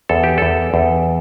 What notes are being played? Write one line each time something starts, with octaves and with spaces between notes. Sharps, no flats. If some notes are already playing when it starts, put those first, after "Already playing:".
E2 A4
G4
E2 A4
E2